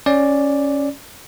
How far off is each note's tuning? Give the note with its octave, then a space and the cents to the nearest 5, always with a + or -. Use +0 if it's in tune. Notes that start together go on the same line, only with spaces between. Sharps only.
C#4 +0 D5 +0